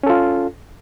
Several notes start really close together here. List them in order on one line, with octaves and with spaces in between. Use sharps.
C#4 A4 F4